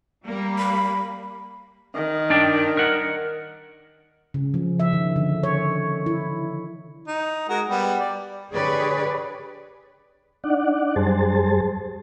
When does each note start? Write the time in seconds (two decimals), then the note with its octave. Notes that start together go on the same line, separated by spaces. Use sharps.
0.24 G3 A#3
0.58 B5
1.95 D#3
2.30 D4 D5 G5
2.77 A#4 F#5
4.34 C#3
4.54 F3
4.80 E5
4.93 D#3
5.16 D3
5.43 C#5
6.06 E4
7.08 D#4
7.49 G#3 F#4 A#4
7.69 G3 B3
7.99 D5
8.54 D3 G4 G#4 B4 C#5 D5
10.44 D4 D#4 D5 F#5
10.96 F#2 G3 G#4 C5 A5